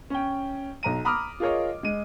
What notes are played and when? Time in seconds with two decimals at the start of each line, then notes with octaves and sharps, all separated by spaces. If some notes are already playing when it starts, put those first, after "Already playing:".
0.10 C#4 G5
0.83 B1 A#5 D#7
1.05 A#5 B5 D6 D#6 F6
1.40 F4 G#4 A#4 C#5 D#5
1.83 G#3 D#7